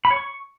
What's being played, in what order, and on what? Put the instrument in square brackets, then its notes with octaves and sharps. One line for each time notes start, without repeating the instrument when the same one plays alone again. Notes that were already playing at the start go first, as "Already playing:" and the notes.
[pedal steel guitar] B5
C#5
C#6